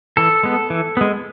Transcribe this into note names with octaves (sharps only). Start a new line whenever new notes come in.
E3 A4
G#3 B3
E3
G#3 B3